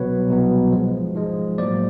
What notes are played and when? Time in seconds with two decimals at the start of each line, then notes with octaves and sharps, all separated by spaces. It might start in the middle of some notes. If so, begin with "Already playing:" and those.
Already playing: C2 B2 F#3 B3 B4 C#5
0.28 C2 B2 F#3 B3
0.72 G#2 F3 G#3
1.15 G#2 F3 G#3
1.58 A2 F#3 A#3 C5 D5